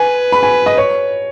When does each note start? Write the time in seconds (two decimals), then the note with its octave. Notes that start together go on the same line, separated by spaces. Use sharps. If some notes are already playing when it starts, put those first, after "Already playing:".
Already playing: B4 G#5
0.32 B5
0.43 G#5
0.66 D#5
0.77 C#5